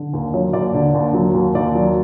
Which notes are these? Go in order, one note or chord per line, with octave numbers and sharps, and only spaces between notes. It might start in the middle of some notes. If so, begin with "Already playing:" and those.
Already playing: D3
D#2
F#3 C#5
D#2 D5
D3
D#2
F#3
D#2
D#2 D5
F#3